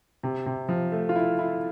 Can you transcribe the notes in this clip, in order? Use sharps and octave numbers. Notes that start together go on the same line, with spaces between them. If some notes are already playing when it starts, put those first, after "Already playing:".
C3
C3
F3
A3
F4
E4
E4